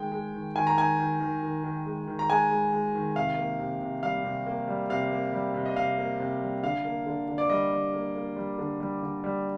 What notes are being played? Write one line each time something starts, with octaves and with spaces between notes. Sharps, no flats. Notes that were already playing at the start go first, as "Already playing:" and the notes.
Already playing: D#3 G#3 G5
G#3
D#3
D#3 G#5
A#5
D#3 G#5
D#3
D#3
D#3
D#3
G#3
D#3
A#5
G#3 G#5
G#3
G#3
D#3
C3 F5
A#3
C3
C3
G3 F5
C3
A#3
G3
C3 F5
A#3
G3
C3
D#5
C3 F5
A#3
C3
G3
D3 F5
A#3
D3
D3
D5
G3 D#5
G3
A#3
A#3
G3
D3
G3
D3
G3